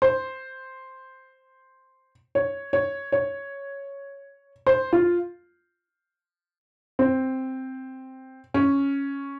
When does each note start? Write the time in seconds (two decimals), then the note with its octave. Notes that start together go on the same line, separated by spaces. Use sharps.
0.02 C5
2.35 C#5
2.73 C#5
3.12 C#5
4.67 C5
4.93 F4
6.99 C4
8.54 C#4